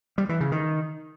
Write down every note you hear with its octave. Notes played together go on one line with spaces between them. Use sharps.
G3
E3
C#3
D#3